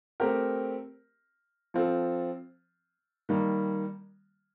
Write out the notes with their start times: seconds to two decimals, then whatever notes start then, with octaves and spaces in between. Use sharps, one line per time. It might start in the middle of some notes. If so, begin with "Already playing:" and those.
0.20 A3 C4 G4 A#4
1.74 F3 C4 F4 A4
3.29 D#3 G3 A#3